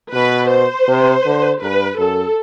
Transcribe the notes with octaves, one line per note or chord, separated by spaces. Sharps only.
B2 B4
C5
C3
D3
G2 B4
F#2 A4